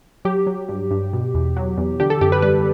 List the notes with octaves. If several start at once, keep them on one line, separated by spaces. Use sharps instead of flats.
F#3 G4
F#3
G2
G2
B2
E2
F#3
E2
D3 G4
A4
F#2 G4
B4
G3 B4